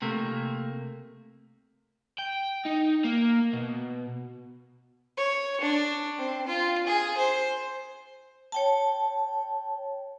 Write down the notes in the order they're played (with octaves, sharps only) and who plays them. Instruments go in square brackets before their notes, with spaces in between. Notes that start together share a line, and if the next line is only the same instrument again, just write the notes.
[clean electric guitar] C3 A3 A#3
[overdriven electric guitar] G5
D#4
A#3
B2
[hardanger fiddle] C#5
D4
C4
F4
G#4
C5
[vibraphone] C#5 G5 A5